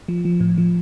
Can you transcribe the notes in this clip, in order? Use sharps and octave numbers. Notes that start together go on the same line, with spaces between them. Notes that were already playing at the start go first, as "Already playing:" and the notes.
F3
F3
A2
F3